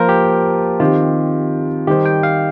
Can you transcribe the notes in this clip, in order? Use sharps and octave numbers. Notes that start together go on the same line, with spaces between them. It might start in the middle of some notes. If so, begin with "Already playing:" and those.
Already playing: F3 A#3 F4 A#4 C5
G4
D#3 C4 F4 G4
D#3 G3 D#4 G4 C5
G5
F5